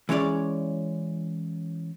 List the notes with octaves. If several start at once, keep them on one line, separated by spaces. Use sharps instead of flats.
E3 G#3 C#4 C#5 D5